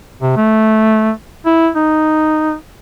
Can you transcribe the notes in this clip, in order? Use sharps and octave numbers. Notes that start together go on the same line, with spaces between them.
C3
A3
E4
D#4